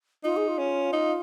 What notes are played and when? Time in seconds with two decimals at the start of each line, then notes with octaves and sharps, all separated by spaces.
0.24 D#4 F4
0.37 G#4
0.48 F4
0.58 C#4
0.93 D#4